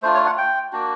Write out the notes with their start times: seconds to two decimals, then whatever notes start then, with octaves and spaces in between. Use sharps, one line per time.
0.03 A3 D4 F4 C5
0.15 C#5
0.26 F#5
0.38 G5
0.73 A#3 D4 F#4